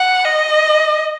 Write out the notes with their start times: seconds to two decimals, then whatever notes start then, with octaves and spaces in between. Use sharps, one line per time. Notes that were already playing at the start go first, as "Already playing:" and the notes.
Already playing: F#5
0.25 D#5